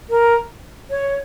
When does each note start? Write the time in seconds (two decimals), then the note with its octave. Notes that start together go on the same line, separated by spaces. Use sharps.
0.10 A#4
0.90 C#5